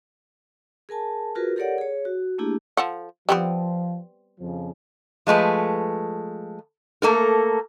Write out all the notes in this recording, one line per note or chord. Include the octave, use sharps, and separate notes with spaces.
G#4 A#4 G#5 A5
F4 F#4 G#4 A#4 B4
G4 A4 A#4 C#5 D5 F#5
G#4 C#5
F#4
A3 A#3 D4 E4 G4 G#4
F3 A4 F#5
F3 G3 B3 C4
F2 C#3 F3
F3 G#3 A3 B4
A3 A#3 A4 A#4